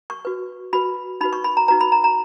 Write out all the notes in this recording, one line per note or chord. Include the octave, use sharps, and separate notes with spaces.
C#6
F#4 B4
F#4 B4 B5
D#4 F#4 B4 B5
C#6
B5
A#5
D#4 F#4 B4 A#5
B5
A#5
A#5